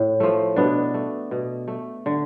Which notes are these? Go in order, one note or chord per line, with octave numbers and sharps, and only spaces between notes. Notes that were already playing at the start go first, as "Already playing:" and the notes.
Already playing: A2
F3 A3
B2 B3 D4
A3
B2
A3
D3